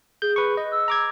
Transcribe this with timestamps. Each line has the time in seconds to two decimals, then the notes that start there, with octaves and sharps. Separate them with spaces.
0.22 G#4 G6
0.36 B4 C#6
0.57 D#5
0.72 E6
0.88 A#5 D6 G#6